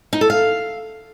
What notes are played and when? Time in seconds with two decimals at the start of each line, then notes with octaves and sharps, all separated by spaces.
0.13 D#4
0.21 A4
0.30 F5